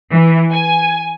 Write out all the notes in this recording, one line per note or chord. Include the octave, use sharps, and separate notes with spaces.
E3
G#5